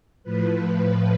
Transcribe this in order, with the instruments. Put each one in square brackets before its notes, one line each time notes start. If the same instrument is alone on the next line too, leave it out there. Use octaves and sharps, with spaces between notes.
[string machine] A2 F3 B4